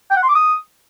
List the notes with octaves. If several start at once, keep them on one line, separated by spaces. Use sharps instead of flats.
G5
F#5
C6
D6
D#6